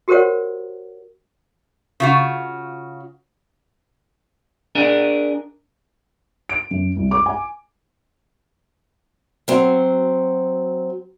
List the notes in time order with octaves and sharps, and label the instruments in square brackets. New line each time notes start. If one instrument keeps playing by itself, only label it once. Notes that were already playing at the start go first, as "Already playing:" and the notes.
[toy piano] F#4 G4 A#4 C5 C#5 F#5
[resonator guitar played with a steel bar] C#3 F4 F#4
[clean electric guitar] D4 G#4 A#4
[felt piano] D7
F#2
C2
D6
G#5
[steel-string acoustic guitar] F#3 C4